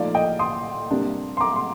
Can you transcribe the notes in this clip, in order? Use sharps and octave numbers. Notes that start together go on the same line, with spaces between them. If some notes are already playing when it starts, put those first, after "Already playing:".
Already playing: A#2 F3 A3 D#4 D5 F5
D#5 G5
C6 D#6
C3 G3 A#3 D4
C6
A#5 D6
C6